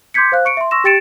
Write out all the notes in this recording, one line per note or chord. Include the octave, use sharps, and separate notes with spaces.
C6 D6 G6 G#6 B6 C#7
C5 F5 F#6
C#6 C#7 D7
E5 C6
C6 C#6 E6 A#6 E7
G4 G5 A6 C#7 D7 E7